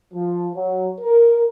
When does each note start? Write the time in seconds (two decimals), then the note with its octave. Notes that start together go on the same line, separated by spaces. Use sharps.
0.14 F3
0.56 F#3
1.01 A#4